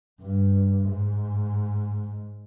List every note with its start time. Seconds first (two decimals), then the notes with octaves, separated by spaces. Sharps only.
0.21 G2
0.90 G#2